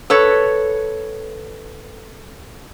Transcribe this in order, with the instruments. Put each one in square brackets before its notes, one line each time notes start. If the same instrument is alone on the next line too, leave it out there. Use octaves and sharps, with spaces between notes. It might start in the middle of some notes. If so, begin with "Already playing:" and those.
[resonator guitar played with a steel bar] A4 B4 C#5